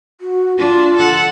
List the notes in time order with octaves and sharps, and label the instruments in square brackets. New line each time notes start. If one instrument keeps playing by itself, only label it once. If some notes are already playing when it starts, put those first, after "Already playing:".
[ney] F#4
[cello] D4 [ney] F4
[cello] A4 F#5